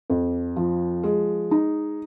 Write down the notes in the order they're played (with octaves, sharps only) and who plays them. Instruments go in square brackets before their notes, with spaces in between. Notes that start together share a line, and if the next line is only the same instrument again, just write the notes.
[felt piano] F2
F3
G#3
D#4